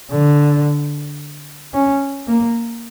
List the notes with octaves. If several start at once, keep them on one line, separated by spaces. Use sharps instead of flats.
D3
C#4
A#3